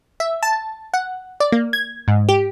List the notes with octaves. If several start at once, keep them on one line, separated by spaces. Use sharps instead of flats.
E5
A5
F#5
D5
A#3
G#6
G#2
G4